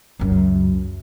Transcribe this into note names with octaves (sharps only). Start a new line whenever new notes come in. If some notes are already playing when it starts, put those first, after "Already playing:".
C#2 F#2